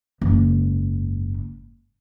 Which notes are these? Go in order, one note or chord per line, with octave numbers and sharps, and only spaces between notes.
F#1 G#2